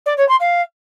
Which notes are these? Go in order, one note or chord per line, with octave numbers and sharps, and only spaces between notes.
D5
C#5
C6
F5